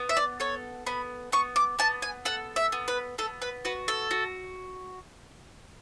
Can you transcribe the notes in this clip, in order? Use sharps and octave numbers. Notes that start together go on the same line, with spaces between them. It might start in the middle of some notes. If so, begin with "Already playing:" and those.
Already playing: B3
E5
D5
A4 C#5
B3 B5
B3 C#6
D6
B3 A5
G#5
A4 F#5
E5
B3
B4
B3 A4
B4
F#4 B4
A4
F#4